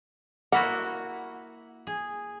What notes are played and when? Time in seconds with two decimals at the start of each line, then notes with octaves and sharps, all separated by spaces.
0.52 A#3 E4 F#4 F#5
1.87 G#4